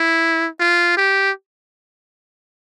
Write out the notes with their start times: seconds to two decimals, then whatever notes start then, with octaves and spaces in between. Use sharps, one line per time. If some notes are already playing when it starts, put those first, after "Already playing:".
Already playing: E4
0.60 F4
0.97 G4